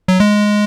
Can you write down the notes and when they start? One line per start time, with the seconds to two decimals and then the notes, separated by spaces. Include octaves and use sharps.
0.08 F#3
0.20 G#3